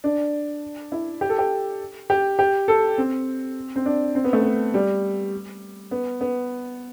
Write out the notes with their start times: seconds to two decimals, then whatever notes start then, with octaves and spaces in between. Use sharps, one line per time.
0.04 D4
0.92 E4
1.21 G4
1.29 A4
1.38 G4
2.10 G4
2.39 G4
2.68 A4
2.98 C4
3.76 C4
3.86 D4
4.15 C4
4.24 B3
4.33 A3
4.43 B3
4.74 G3
5.91 B3
6.21 B3